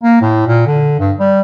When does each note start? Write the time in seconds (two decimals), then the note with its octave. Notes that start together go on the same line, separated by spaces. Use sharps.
0.03 A#3
0.22 A2
0.47 A#2
0.67 D3
1.00 G2
1.20 G3